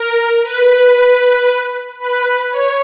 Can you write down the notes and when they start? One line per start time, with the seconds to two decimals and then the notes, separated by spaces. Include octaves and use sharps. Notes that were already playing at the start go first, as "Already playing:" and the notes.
Already playing: A#4
0.43 B4
1.99 B4
2.51 C#5